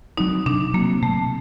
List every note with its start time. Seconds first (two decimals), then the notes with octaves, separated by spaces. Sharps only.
0.17 F#3 C4 D#4
0.46 C3 D4
0.74 F#3 A#3
0.78 C4
1.02 C3 A3